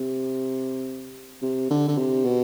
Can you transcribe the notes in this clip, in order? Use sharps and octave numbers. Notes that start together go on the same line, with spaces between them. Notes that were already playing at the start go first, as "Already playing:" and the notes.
Already playing: C3
C3
D3
D3
C3
B2